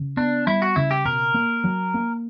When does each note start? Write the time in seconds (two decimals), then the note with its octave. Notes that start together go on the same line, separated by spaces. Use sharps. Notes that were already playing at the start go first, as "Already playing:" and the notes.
Already playing: C#3
0.17 B3 D4
0.47 G3 E4
0.62 F#4
0.76 C#3 E4
0.91 G4
1.05 B2 A#4
1.34 A#3
1.64 F#3
1.94 A#3